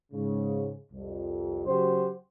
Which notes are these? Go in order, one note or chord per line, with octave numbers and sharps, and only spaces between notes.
G#2 C#3
C2 F2
C#3 F#3 F#4 G4 C5